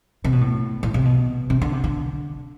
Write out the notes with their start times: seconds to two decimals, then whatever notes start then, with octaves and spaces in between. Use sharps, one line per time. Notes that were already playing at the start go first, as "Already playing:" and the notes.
0.24 C3
0.33 B2
0.41 A2
0.83 A2
0.94 C3
1.05 B2
1.50 C3
1.62 D3
1.73 C3
1.84 D3